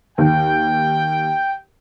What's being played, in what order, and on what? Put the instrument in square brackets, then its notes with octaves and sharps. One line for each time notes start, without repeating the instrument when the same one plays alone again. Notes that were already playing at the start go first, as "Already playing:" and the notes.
[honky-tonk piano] D#2 [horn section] G5